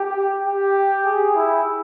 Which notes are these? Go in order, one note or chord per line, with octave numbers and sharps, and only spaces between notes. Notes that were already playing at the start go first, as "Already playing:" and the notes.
Already playing: G4
G4
G#4
E4